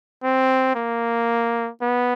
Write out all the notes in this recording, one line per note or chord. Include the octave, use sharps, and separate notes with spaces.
C4
A#3
B3